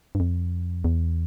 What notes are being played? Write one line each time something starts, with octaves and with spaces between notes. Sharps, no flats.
G2
F2
E2